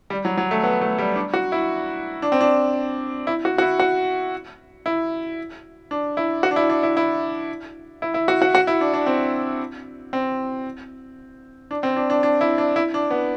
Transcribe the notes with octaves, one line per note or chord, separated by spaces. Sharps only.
G3
F#3
F#3
A3
B3
A3
G3
D4
F#4
E4
D4
C4
D4
E4
F#4
F#4
E4
F#4
E4
D4
E4
F#4
D4
E4
D4
E4
E4
E4
E4
F#4
F#4
F#4
E4
D4
D4
C4
C4
D4
C4
D4
D4
D4
E4
D4
E4
D4
B3